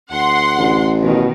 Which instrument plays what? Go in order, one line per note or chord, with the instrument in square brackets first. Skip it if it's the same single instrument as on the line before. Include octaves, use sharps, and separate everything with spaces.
[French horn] D2 [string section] F#5 C6
[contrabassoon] A1
[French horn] B2 [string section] D#3